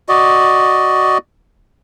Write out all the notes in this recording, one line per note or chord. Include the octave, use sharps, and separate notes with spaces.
F#4 D5 D#5